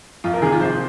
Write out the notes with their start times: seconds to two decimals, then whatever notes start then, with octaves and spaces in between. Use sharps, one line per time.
0.24 F2 F4
0.34 A#4
0.42 C3 D#3 G#4
0.52 F4
0.61 F2 C5